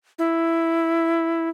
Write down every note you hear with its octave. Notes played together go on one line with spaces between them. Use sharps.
E4